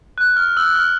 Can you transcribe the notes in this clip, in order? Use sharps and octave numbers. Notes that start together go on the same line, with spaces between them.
F#6
F6
E6
F6